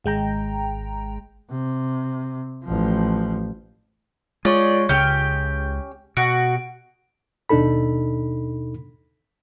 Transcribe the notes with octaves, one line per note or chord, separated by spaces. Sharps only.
G#1 G#3 G5 A#5
C3
A1 F3
G#3 F4 C#5 D5 C#6
C#2 C#3 C#4 G4 G6
B2 F#4 D7
D#2 B2 D4 D#4 A4 B5